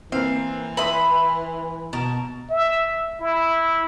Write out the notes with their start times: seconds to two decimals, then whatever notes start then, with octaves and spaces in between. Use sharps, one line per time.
0.12 E3 A#3 C4 F5
0.77 B4 E5 B5 C6 D#6
1.93 B2 A#4 A5
2.50 E5
3.20 E4